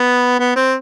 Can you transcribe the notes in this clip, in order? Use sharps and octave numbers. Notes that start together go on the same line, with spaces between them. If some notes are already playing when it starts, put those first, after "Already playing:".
Already playing: B3
B3
C4